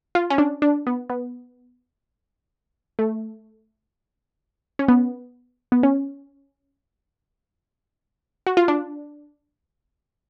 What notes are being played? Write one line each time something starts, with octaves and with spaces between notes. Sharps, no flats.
F4
C#4
D4
D4
B3
B3
A3
C#4
B3
B3
C#4
F#4
F4
D4